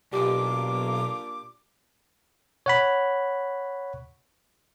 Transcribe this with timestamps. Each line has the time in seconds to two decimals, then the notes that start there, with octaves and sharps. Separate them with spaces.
0.13 B1 A#2 D4 F4 G4 D6
2.66 C#5 F#5 B5